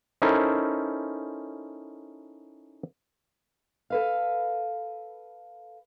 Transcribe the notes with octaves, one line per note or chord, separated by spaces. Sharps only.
C#4 D#4 E4 A4 A#4 C5
A4 B4 F5